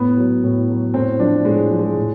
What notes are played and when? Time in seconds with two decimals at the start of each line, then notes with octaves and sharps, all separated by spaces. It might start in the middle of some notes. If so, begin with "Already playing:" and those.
Already playing: A2 B3
0.17 F#3
0.44 A2
0.69 F#3
0.94 A2 C4
1.19 F3 D4
1.45 A2 G#3
1.71 F3
1.79 G#3
1.96 A2